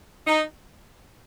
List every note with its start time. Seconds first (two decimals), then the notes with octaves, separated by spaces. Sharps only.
0.25 D#4